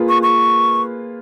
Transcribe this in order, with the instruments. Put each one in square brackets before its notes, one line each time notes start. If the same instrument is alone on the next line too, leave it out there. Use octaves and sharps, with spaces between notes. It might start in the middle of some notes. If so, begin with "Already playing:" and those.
Already playing: [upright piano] A#3 F4 G#4 B4
[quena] C#6
C#6